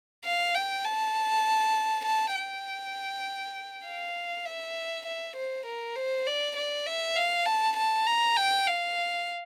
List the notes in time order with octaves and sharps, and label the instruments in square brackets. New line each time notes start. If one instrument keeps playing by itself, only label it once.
[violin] F5
G5
A5
A5
G5
F5
E5
E5
C5
A#4
C5
D5
D5
E5
F5
A5
A5
A#5
G5
F5